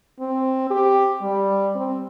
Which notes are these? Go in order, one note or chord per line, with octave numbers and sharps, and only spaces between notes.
C4
G4
G3
C4